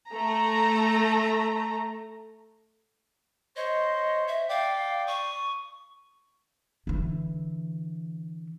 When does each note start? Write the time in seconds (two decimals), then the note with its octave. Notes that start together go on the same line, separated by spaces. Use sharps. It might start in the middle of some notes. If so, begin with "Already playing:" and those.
0.11 A3 A#5
3.56 C5 C#5 D#5
4.28 E5
4.49 D5 F5 G5
5.07 C#6 D#6
6.87 D3 E3